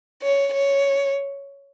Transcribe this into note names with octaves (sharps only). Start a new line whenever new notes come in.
C#5
C#5